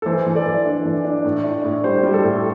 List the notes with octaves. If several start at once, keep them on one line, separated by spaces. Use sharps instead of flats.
A4
E3 C5
E3
A4 D5
E3
D4
E3
D4
A2
D4
A2
G3 C5
G3
A4
A2